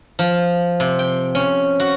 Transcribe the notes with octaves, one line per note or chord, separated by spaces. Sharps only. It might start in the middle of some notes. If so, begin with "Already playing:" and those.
F3
C3
G5
C#4
F#4